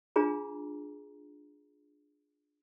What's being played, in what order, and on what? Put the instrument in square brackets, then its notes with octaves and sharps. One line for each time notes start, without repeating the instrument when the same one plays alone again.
[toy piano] D4 F4 G#4 A#5